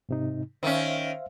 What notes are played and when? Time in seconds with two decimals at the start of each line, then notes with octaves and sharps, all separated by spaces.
0.09 G#2 C3 D#4
0.63 D#3 C#4 C5 E5 F5